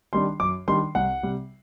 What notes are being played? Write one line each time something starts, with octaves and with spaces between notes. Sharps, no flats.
D#3 G3 D4 C6
F#2 D6
D#3 G3 D4 C6
C2 F#5
C3 G3